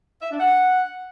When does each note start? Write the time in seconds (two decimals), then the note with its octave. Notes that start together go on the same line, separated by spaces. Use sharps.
0.21 E5
0.30 D4
0.39 F#5